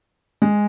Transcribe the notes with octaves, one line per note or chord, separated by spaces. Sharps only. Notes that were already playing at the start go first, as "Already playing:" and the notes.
G#3